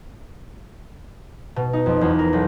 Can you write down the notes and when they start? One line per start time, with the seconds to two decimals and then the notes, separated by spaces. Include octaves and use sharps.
1.56 B2
1.73 D#4
1.86 F2
2.01 E2
2.19 A#4
2.33 B1